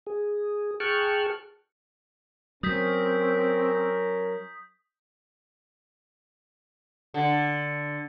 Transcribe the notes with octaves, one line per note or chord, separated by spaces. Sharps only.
G#4
G#4 G5 A5 C#6 F6 F#6
F#3 C4 C#4 A#4 D#6 G6 B6
D3